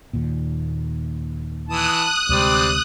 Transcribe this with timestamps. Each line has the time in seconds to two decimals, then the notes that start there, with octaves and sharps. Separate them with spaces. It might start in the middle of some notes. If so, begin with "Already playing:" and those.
0.13 D#2 A#2
1.69 E3 A5 D#6 F#6
2.29 D2 C3 G3 G#3 C4 D5